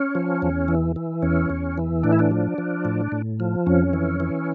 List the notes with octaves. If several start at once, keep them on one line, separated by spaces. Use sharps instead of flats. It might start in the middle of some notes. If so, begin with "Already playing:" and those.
Already playing: C#4
F3
E2
E3
E3
E2 C#4
E2
E3
A2 D4
E4
D4
F3
F3
A2
A2
F3
F2 C#4
E3
E3